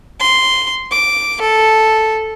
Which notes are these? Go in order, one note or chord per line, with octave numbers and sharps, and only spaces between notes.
C6
D6
A4